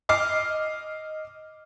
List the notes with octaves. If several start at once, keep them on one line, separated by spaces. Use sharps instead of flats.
D#5 D6 F6 C7